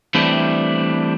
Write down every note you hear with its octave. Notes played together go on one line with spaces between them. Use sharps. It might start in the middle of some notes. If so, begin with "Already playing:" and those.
E3 G3 A3 C4 D4 E4